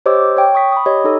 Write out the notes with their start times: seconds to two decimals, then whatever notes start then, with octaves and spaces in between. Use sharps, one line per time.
0.06 G4 C5 C#5 D#5 D6 E6
0.37 C#5 G5
0.55 C#6 D#6 B6
0.72 B5 D#6
0.86 G4 C#5 D#5
1.04 D#4 A4 C#5